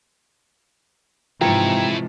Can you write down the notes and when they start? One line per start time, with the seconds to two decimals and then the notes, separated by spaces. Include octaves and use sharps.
1.41 G#2 C3 E3 F3 E4 C#5 G5 A#5